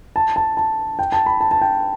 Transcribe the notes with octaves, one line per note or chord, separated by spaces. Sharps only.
A5
A5
A5
G5
A5
B5
A5
A5
G5